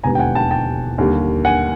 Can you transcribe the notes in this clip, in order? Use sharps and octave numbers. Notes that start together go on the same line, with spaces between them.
E1 D#2 D3 G3 B3 G#5 A#5
G5
F#5 G#5
G5 A5
G5 A5
D#2 D3 G3 A#3
F#5 G#5